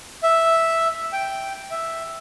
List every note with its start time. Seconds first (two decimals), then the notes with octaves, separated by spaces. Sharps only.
0.23 E5
1.13 G5
1.71 E5